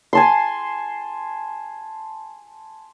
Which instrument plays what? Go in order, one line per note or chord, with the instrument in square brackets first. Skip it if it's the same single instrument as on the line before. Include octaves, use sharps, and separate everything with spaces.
[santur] G#5 A5 C6